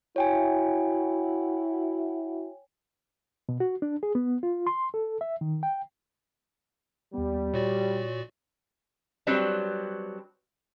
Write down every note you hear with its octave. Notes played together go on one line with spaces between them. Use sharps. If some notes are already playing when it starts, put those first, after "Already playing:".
E4 F#4 C#5 G5 G#5
B2
F#4
D4
G#4
B3
F4
C6
A4
E5
D#3
G5
D#2 G3 B3
A#2 F#4 C#5 D5
F#3 G3 B3 C4 D4